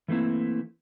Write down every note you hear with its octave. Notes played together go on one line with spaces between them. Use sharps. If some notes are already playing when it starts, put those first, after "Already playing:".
E3 A3 A#3 C4 E4